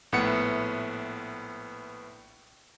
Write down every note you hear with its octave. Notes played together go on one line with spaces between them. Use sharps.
A#1 A2 B3 F#5 C#7